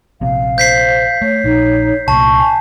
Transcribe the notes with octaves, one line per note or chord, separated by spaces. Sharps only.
A#1 C3 F5
C5 G6 B6 C7
A3 C#5
A#1 D#4
C2 A#2 A5 C#6
G#5